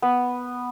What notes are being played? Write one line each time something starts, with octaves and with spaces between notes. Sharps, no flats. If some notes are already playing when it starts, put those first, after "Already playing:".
B3